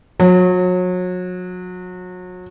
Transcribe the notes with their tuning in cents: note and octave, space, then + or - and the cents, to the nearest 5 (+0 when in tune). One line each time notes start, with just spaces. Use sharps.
F#3 -30